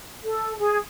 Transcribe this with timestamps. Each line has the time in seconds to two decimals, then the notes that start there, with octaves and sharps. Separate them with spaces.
0.23 A4
0.58 G#4